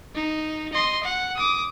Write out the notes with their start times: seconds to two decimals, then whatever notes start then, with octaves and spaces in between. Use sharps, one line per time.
0.15 D#4
0.73 D#5 C6
1.03 F#5
1.36 D6 D#6